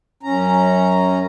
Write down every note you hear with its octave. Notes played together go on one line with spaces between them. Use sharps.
F#2 C#4 A#5